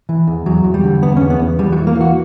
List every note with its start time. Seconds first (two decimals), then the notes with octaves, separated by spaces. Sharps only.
0.09 E3
0.27 E2
0.46 E2 F#3
0.64 E2
0.74 G3
0.84 D3
1.02 E2 B3
1.17 E2 C#4
1.30 B3
1.39 E2
1.59 E3 G3
1.72 F#3
1.78 E3
1.87 A#3
1.96 E3 F#4